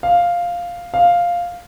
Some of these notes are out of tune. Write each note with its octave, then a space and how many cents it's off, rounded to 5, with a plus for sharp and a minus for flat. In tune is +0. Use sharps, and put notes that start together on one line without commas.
F5 +0
F5 +0